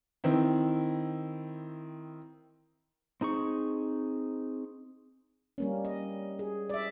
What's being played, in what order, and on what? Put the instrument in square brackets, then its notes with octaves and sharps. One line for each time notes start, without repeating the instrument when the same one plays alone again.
[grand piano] D#3 C4 E4
[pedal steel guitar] C4 D#4 G#4 C#6
[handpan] G3 A#3 C#4
D#5
G#4
D5 E5